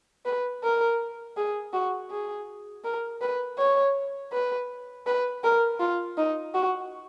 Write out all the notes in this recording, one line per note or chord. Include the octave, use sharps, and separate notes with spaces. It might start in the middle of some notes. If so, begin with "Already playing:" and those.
B4
A#4
G#4
F#4
G#4
A#4
B4
C#5
B4
B4
A#4
F4
D#4
F#4